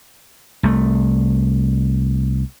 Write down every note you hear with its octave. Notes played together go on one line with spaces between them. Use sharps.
C2 A3